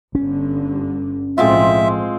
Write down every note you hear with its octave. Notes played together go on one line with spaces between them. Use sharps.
G1 G2 D3 C#4
B1 A2 F3 G#3 C4 F4 E5